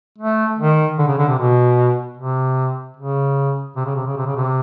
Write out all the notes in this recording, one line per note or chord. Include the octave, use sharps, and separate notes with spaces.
A3
D#3
D3
C#3
D3
C3
B2
C3
C#3
C3
C#3
C3
C#3
C3
C#3
C3